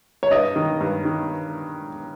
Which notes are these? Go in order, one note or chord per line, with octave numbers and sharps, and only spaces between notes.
C#5
G2 D#5
D#3
G2
D#3